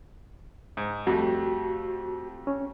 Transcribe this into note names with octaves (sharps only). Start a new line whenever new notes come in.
G#2
F2 G3 A3 F#4
C#4